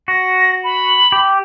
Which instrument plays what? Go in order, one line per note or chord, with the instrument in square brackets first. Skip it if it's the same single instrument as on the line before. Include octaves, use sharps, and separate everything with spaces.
[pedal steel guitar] F#4 [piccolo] A#6
[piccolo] B5
[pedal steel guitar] G4